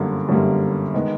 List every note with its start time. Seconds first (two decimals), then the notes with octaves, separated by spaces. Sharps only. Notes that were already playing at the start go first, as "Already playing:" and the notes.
Already playing: G1 F#2 D3 G3 A#3
0.29 G1 F#2 D3 G3 A#3
0.94 D#3 G#3 B3